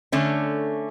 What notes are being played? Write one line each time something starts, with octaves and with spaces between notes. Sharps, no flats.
D3 A3 C#4